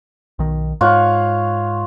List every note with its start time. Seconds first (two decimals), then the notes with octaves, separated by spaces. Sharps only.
0.39 B1 D#3
0.81 G#2 F4 C#5 F#5